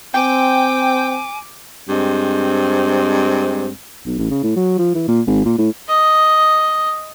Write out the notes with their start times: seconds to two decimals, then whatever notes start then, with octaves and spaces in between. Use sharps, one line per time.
0.14 C4 G5 G#5 D6
1.88 G2 G#3 C4
4.06 B1
4.18 A1
4.30 C#3
4.43 A2
4.56 F#3
4.78 F3
4.94 E3
5.08 A#2
5.27 G#1
5.45 A#2
5.58 A2
5.88 D#5